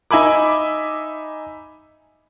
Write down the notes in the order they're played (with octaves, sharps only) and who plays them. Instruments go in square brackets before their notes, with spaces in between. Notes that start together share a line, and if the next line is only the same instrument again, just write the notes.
[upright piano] D#4 E5 G#5 B5 D6